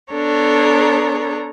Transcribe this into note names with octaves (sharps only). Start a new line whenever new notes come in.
B3 D4 A4 C#5 A#5